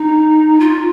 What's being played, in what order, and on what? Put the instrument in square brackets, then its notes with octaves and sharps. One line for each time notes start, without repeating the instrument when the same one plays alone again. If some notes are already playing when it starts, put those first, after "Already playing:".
Already playing: [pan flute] D#4
F4